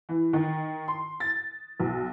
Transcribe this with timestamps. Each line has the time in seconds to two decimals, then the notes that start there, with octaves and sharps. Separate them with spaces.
0.09 E3
0.33 D#3
0.88 C6
1.20 A6
1.80 B1